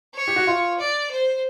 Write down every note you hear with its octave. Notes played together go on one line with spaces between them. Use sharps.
C#5
G4
F#4
F4
D5
C5